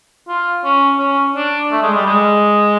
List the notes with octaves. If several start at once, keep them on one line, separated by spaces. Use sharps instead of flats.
F4
C#4
C#4
D4
A3
G#3
G3
G#3